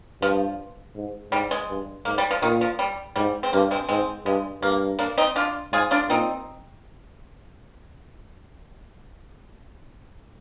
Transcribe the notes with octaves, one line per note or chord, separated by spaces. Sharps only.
G2 F3
G#2
G#2 G3
G#3
G2
G#2 A#3
G3
F3
A#2 D#3
F3
G3
G#2 G3
C4
G2 A#3
G#3 C4
G#2 G#3 C4
G2 G#3
G2 A#3
A#3 D4
C4 D#4
D4 F4
G#2 F4 G#4
D4 F4
A#2 C4 D#4